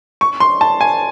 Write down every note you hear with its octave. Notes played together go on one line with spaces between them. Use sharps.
C#6
C6
A5
G#5